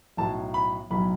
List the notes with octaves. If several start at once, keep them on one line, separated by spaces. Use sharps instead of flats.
B1 A2 F#3 A5
B5
B1 A2 F#3 B5